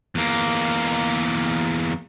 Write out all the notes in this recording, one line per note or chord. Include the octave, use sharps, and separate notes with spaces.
E2 A#3